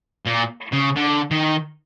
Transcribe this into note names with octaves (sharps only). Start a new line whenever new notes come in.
A#2
C#3
D3
D#3